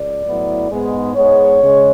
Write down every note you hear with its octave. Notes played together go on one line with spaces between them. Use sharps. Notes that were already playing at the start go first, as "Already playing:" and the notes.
Already playing: C#2 D5
A2 F#3 B3 E4
G#2 G#3 B3
G#2 G#3 B3 C#5
C#3 G#3